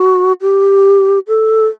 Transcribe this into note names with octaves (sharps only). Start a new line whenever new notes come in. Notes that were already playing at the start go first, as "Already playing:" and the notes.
Already playing: F#4
G4
A4